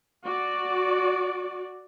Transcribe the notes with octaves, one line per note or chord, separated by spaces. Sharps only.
F#4 D5